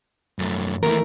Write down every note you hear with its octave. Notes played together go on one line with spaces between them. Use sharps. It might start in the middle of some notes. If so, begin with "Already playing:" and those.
F#2 A3
D#2 E3 A3 A#4